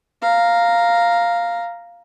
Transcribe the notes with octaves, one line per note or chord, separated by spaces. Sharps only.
F5 A#5